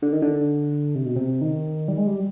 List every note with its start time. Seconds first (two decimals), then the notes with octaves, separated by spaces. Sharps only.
0.02 D3
0.13 D#3
0.22 D3
0.95 C3
1.05 B2
1.16 C3
1.41 D#3
1.88 G3
1.97 G#3
2.07 G3